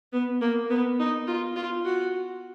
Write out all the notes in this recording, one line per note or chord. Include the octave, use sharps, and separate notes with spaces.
B3
A#3
B3
D#4
F4
F4
F#4